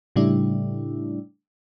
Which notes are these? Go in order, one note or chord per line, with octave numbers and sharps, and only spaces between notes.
A2 C#3 G3 A3 D4 E4